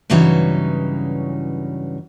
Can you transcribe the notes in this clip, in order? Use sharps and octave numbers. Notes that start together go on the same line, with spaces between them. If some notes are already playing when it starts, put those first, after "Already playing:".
G2 C#3 E3 F#3 C#4 D#4